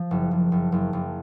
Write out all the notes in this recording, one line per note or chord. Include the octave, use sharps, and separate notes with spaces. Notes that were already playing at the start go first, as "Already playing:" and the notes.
Already playing: F3
F#1
F#1
F#1
F#1
F#1